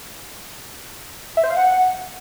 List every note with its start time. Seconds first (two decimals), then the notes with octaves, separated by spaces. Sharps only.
1.37 E5
1.44 C5
1.50 F5
1.57 F#5